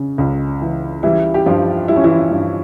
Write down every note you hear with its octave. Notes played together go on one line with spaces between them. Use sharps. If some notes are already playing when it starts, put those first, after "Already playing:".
Already playing: C#3
C#2
E3
E3 G3 E4
G4
G2 F3 F4
G3 E4
C#4
E3 E4
G2